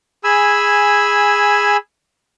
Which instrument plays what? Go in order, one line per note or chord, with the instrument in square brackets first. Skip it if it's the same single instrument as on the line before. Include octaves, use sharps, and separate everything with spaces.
[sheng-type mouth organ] G#4 G#5 B5 E6